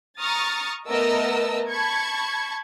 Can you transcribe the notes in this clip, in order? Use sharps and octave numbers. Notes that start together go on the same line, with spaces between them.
A#5 C#6 D#6 F6 A6
A3 B3 A#4 D#5 A5 E6
A5 B5 C#6 G#6